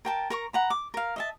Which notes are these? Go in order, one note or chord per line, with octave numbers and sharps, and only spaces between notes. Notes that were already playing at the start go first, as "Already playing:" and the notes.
A#4 G5 A5
A#4 A#5 C#6
F#5 A#5 B5
D6
A#4 F5
D#5 E5 A5